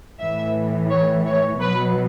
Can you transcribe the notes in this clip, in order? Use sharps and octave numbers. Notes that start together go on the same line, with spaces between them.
A2 E3 E5
C#5
C#5
B2 F#3 B4